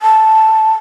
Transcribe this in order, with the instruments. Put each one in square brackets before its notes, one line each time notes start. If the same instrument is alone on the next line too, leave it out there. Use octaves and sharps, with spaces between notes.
[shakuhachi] A5